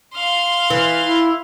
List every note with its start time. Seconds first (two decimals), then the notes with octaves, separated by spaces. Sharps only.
0.15 F5 C6
0.70 E3
1.03 E4